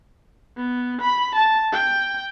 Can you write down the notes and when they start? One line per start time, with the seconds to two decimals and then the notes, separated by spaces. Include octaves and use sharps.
0.57 B3
1.01 B5
1.35 A5
1.73 G5